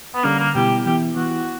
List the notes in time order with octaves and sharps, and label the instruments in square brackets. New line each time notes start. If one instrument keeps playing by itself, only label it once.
[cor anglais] B3
[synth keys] D3 G3 C#4 [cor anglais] A#3
[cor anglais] A#3
[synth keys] B2 G3 B3 E4 [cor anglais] G4
[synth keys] E3 B3 E4 [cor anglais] G4
[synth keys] E3 B3 E4 [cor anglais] F#4